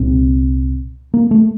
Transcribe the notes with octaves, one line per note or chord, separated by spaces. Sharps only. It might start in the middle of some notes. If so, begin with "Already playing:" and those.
Already playing: C2 A#2 C4
A#3
A3